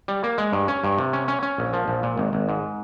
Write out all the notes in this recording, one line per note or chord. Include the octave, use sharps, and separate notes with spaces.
G3
A#3
G#3
G2
C#4
G2
C3
C#4
C#4
C#4
A#1
F3
A#1
A#2
G#1
G#1
G#2